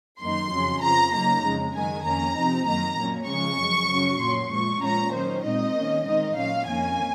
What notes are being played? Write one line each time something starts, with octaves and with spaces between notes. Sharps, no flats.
F#2 D#3 A#3 D#4 C6
F2 C#3 F#3 C#4
F2 C#3 F3 A#5
C#3 F#3 A#3 D#4 A#5
F2 C#3 G#3
F#2 D#3 G#3 G#5
F2 D#3 A#3 C#4 A#5
C3 F3 C4 D#4
F#2 D#3 A#3 A#5
A#2 F#3 A#3 C#4
C#3 F3 G#3 C#4 C#6
F#2 F3 G#3
C#3 F#3 C#4
A#2 F#3 C#4 C6
A#2 F3 G#3 C#6
A#2 F3 G#3 C#4 A#5
D#3 F#3 C#4 C5
A#2 G#3 C4 D#4 D#5
D#3 A#3 C#4
D#3 G#3 C4 D#4 D#5
A#2 F#3 C#4 F5
F2 D#3 A#3 C#4 G#5